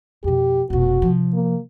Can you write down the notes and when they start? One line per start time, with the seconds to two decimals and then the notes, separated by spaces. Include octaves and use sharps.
0.24 F2 B2 G4
0.70 F1 B2 F#4
1.02 C3 F3
1.34 A#3